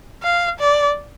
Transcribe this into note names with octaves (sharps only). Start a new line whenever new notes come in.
F5
D5